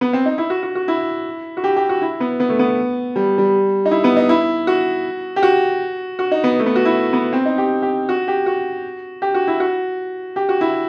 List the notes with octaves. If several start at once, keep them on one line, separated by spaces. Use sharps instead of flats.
B3
C4
D#4
E4
F#4
F#4
F#4
E4
F#4
G4
G4
F#4
E4
B3
B3
A3
B3
G3
G3
D#4
E4
B3
D#4
E4
F#4
G4
F#4
F#4
D#4
B3
A3
B3
F#4
E4
B3
C4
D#4
G4
G4
F#4
G4
F#4
G4
F#4
E4
F#4
G4
F#4
E4